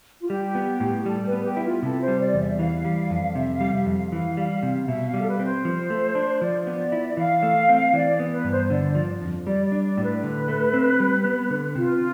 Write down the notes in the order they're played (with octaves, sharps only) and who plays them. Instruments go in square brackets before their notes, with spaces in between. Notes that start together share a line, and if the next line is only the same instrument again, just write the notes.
[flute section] F4
[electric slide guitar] G3 [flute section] G4
[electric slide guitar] B3
A2
[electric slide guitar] G3 [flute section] A4
[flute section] B4
[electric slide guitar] B3
[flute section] G4
[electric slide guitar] E4
[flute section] F4
[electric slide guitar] C3 [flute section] A4
[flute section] C5
[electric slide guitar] G3
[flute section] D5
[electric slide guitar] E2
[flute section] E5
[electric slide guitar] E3 [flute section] F5
[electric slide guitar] G3
F2
[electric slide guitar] C3 [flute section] E5
[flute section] F5
[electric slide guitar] G3
[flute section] E5
[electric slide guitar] F2
[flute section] F5
[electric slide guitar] E3 [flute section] F5
[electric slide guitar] G3 [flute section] F5
[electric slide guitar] C3 [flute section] F5
[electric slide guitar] B2 [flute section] E5
[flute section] F5
[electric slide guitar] G3
[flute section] A4
B4
[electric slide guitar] C4
[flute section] C5
[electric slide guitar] F3
A3
D4
[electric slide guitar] F3 [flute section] D5
[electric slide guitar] B3
E4
[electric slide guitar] E3 [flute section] F5
[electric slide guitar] A3
C4
[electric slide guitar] E3 [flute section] D5
[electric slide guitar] B3
[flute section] B4
[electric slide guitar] G2
[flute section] C5
[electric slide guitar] D3 [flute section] D5
[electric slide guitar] F3
F2
[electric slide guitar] G3 [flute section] D5
[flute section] D5
[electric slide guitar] D4
[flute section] D5
[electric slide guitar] A2
[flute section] B4
[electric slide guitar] D3
A3
C4
G3
B3
D3
[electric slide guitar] C3 [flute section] F4